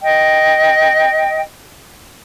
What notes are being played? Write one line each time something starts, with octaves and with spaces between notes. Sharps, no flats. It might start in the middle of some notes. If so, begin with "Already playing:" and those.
D#5 G5